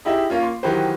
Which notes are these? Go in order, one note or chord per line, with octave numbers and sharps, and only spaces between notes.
D#4 E4 G4 G#4 D#5 E5
A#3 C#4 F4
C6
D#3 E3 F#3 G4 B4 C5